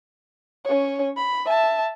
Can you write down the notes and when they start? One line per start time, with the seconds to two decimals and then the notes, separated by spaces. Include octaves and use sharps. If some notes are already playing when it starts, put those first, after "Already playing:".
0.65 C#4 C#5
1.17 B5
1.46 E5 A5